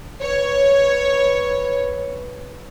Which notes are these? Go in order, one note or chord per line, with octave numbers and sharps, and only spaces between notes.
B4 C#5